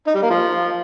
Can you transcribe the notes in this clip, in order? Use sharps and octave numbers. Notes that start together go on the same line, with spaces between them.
D#4
G3
A#3
F3